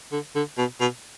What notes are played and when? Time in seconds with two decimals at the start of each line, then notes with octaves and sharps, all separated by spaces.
0.12 D3
0.35 D3
0.58 B2
0.80 B2